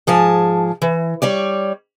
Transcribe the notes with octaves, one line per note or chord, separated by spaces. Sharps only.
G#2 F3 G#4 A5
E3
G3 C#5 D5